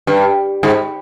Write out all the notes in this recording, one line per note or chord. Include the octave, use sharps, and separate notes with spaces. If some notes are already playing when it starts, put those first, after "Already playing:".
G2
G#2